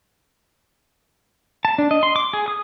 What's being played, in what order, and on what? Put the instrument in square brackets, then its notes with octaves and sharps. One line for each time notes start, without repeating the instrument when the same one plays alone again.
[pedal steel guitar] A5
D4
D#5
C6
D6
G#4
D#6